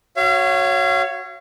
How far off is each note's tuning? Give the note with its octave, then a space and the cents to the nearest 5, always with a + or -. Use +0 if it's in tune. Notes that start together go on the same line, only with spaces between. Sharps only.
F#4 +0 C#5 +0 F5 -40